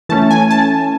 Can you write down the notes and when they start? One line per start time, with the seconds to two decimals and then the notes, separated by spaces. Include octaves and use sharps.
0.09 E3 A3 C#4 A5
0.31 G#5
0.51 A5